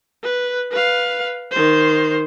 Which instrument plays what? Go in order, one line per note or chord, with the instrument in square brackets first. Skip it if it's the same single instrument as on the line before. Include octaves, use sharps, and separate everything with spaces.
[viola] B4
B4 F5
D#3 C5